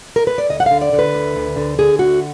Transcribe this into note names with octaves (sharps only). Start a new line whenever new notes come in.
A#4
B4
D5
D2 D#5
F#5
D3 F5
D5
D3
B4
D2
D2
D3
D3 G#4
D2 F#4